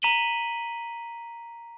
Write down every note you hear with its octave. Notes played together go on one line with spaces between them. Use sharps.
A#5 B6 D#7 F#7 G7